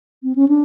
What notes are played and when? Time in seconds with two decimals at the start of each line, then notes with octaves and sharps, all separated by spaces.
0.23 C4
0.35 C#4
0.48 D4